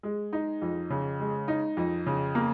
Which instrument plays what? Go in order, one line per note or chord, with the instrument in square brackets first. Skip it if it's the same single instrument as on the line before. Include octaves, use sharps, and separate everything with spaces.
[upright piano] G#3
D#4
F2
C#3
G#3
D#4
F2
C#3
A#3